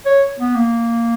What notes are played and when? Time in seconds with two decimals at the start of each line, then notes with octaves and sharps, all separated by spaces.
0.06 C#5
0.39 B3
0.56 A#3